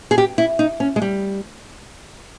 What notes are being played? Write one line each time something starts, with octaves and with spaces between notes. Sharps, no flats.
G#4
G4
E4
D#4
C#4
G#3
G3